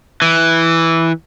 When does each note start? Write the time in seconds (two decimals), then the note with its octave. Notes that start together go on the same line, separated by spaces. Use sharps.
0.22 E3